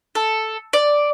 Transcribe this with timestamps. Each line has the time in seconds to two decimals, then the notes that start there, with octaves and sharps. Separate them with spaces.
0.15 A4
0.73 D5